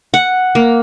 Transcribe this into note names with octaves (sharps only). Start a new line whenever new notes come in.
F#5
A#3